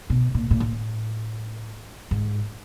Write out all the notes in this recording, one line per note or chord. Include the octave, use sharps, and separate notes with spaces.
B2
A#2
A#2
A2
G#2